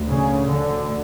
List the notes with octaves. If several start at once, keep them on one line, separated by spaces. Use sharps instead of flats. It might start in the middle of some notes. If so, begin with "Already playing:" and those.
Already playing: D2
C#3
D3